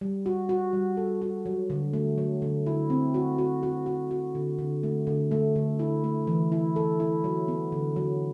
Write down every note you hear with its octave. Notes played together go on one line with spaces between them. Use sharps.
G3
F#4
F#4
G3
A4
F#4
F#3
D3
A3
F#3
D3
E4
C4
F#4
F#4
F#4
F#4
F#4
D3
D3
A3
D3
A3
D3
E4
A3
E3
E4
A4
E4
F#3
B3
D3
F#3